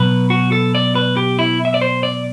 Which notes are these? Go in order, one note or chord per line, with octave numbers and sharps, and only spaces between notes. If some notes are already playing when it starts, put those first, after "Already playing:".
Already playing: B2 F#3 B4
F#4
A4
D5
B4
G4
E4
E5
D5
C5
D5